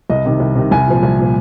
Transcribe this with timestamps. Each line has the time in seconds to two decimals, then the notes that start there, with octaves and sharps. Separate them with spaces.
0.10 C2 D#5
0.25 C3 D#3
0.40 C2
0.56 C3 D#3
0.71 C2 G#5
0.87 A#2 F3
1.03 C2
1.18 A#2 F3